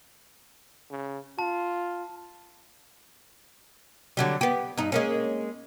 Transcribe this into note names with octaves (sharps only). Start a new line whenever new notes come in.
C#3
F4 A5
D3 F#3 G3
B3 G4
G2 D#4
G#3 A#3 C#4